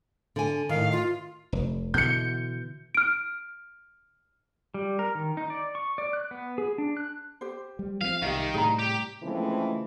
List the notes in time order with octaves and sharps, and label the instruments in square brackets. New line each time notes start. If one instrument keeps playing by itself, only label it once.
[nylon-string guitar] D3 G#5
[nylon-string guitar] A2 D#3 [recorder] F5
[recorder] F4
[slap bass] F1
[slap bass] B2 D3 E3 [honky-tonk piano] G6 C#7
[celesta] F6 D7
[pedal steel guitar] G3
A#4
D#3
D#4
D5
C#6
D5
F#6
B3
G#4
D4
F#6
[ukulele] G4 C5
[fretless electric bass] G3
[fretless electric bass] F3 A3 C4 [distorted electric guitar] F5
[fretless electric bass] C2 [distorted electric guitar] D#3 [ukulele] G4 E5 F5
[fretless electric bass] A2 C3 G3 [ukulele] G#4 A#5
[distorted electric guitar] G4
[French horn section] C#3 E3 F3 G#3 A3 C4